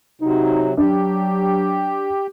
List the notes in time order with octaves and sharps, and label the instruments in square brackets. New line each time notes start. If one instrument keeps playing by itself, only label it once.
[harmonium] C3 F#3 [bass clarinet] D#4
[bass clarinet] F#3 [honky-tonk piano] D4 [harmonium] G4